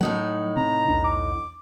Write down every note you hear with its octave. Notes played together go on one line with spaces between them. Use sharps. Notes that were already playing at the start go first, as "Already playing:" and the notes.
A2 F#3 D#4 F#5
C3 C4 A#5
B1 E2 D4
D6